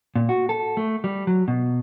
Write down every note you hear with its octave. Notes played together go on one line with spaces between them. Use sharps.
A#2
F#4
A4
A3
G3
F#3
B2